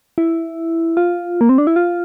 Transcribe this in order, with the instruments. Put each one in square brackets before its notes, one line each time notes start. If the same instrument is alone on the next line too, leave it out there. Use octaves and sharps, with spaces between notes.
[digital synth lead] E4
F4
A#3
C4
D4
E4
F4